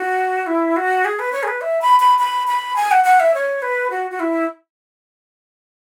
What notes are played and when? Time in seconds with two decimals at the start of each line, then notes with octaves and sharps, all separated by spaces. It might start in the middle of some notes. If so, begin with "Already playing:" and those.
Already playing: F#4
0.46 E4
0.76 F#4
1.05 G#4
1.19 B4
1.32 C#5
1.43 G#4
1.48 B4
1.61 E5
1.81 B5
2.00 B5
2.19 B5
2.47 B5
2.76 G#5
2.91 F#5
3.04 F#5
3.20 E5
3.34 C#5
3.62 B4
3.90 F#4
4.11 F#4
4.20 E4